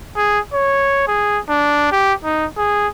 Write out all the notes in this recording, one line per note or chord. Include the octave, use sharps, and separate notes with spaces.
G#4
C#5
G#4
D4
G4
D#4
G#4